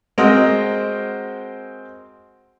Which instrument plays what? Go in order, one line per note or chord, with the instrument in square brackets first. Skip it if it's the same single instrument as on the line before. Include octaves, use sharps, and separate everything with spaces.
[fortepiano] G#3 C4 F#4 A#4 C5 D#5